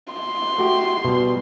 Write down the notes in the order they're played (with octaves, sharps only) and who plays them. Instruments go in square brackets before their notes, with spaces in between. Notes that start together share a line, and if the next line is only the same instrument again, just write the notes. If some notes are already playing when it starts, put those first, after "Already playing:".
[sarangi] C6
[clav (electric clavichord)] A3 F#4 G4
B2 G3